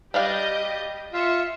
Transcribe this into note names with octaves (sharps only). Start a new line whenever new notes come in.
G3 D4 G4 D#5 F5 G6
F4 E5 C#7